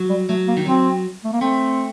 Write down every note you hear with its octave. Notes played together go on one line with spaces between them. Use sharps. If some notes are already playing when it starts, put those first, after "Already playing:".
Already playing: F#3
G3
F#3 A3
A#3
D#3
F#3 C4
A3
A#3
A3 C4